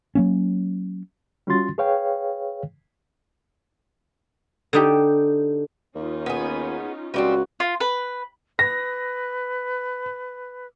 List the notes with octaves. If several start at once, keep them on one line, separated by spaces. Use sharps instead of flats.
F#3 A#3 C#4
G3 C#4 F4 F#4 C6 A6
G#4 B4 C#5 F5 G5
D3 D#4 G4
D#2 C#4 D#4 F4
B3 G#4
C#2 F3 G3 C4 F#4
F4
B4
B4 A#6